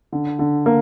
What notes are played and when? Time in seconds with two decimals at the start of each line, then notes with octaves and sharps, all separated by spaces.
0.12 D3
0.39 D3
0.66 A#3